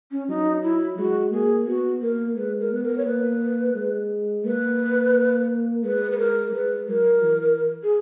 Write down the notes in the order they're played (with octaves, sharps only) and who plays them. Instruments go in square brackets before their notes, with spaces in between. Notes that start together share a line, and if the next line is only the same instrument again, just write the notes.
[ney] C#4
[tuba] F#3 [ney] D#4
[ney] E4
[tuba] G#3 [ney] F#4
[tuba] A#3 [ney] G#4
[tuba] B3 [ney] F#4
[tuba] A#3 [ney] A#4
[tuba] G#3 [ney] B4
[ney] A#4
[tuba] B3 [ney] B4
[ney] A#4
C#5
[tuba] A#3 [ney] B4
[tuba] G#3
[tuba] A#3 [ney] B4
[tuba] G#3 [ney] B4
[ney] B4
A#4
[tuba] G#3 [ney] B4
[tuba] F#3 [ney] A#4
[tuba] E3
[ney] G#4